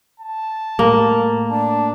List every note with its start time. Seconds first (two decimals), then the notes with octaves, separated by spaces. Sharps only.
0.20 A5
0.79 A2 A#3
1.51 D4 A5